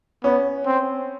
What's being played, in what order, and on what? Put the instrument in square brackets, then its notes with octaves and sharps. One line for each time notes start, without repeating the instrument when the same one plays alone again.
[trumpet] B3 [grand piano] C#4
[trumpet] C4